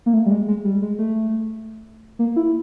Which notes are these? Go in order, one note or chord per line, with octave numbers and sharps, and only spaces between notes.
A#3
A3
G3
G#3
G#3
G3
G#3
A3
A#3
E4